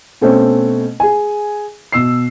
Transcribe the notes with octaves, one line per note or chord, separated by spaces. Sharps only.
B2 A3 C4 C#4
G#4 G#5
B2 E6 C7